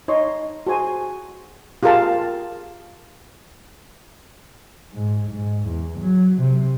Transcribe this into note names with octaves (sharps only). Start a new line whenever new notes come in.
D#4 C#5 D#5 C6 C#6
F#4 G#4 C5 G#5 C6
F4 G4 G#4 A#4 F5 A5
G#2
G#2
E2
F#3
C3